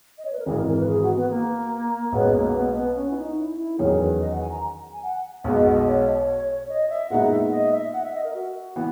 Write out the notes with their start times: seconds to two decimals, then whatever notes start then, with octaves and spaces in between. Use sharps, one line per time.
0.18 D#5
0.25 C#5
0.32 B4
0.39 A#4
0.46 G#1 G#2 E3 G#4
0.58 A#4
0.68 A#4
0.78 B4
0.88 G#4
1.02 F#4
1.16 B3
1.30 A#3
2.12 B1 B2 G#3 B3 C#4
2.33 A#3
2.54 B3
2.75 B3
2.96 C#4
3.11 E4
3.17 D#4
3.37 E4
3.58 E4
3.79 E2 D#3 F#3 C#4 G#4 A#4
3.99 B4
4.20 D#5
4.30 F#5
4.40 G#5
4.51 A#5
4.93 G#5
5.03 F#5
5.44 B1 B2 G#3 B3 D#5
5.55 D#5
5.65 F#5
5.76 D#5
5.86 C#5
6.69 D#5
6.89 E5
7.10 A#2 G#3 B3 D#4 F#5
7.31 E5
7.52 D#5
7.73 E5
7.93 F#5
8.03 E5
8.14 D#5
8.24 A#4
8.34 F#4
8.76 E3 B3